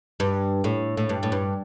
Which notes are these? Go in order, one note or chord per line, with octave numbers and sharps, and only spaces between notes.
G2
A2
A2
G2
A2
G2